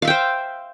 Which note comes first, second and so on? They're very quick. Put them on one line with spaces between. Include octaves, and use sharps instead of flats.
F5 E5 G5 C5